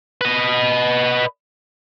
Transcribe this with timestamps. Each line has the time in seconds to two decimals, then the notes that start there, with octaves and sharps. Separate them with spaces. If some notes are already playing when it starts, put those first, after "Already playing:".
0.21 B4 D#5